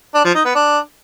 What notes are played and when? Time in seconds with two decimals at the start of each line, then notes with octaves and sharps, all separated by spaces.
0.14 D4
0.25 F3
0.35 D#4
0.45 B3
0.55 D4